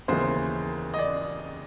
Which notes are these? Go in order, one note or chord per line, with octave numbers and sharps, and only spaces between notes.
D#2 C#3 E3 G#3 B3 C5
D#5
D5